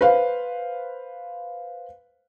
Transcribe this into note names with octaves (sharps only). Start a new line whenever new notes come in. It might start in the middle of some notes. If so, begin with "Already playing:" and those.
B4 C5 F5